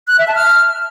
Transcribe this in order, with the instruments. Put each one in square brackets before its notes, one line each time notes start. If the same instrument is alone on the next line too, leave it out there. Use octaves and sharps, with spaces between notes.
[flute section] F#6
E5
A5
F6